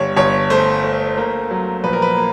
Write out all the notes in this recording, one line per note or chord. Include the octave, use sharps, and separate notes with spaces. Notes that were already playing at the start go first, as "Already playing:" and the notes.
Already playing: G1 G3 C#5
G1 C#5
A3 C5
A3
A#3
F#3
A#1 B4
A#4
B4
A#3